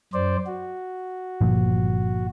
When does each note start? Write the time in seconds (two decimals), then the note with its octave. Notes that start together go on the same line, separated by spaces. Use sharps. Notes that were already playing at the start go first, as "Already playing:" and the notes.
0.14 F#2 C5 D5
0.46 F#4
1.41 G1 A#2 F3